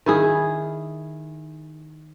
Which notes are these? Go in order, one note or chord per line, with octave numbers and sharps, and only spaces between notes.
D#3 E4 G#4